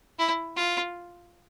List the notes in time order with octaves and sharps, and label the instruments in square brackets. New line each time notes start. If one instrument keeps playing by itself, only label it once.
[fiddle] E4
F4